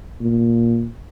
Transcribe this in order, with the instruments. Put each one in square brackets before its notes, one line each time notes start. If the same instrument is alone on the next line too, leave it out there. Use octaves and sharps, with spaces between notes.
[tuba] A#2